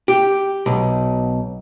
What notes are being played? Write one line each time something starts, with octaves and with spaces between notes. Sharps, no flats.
G4
B1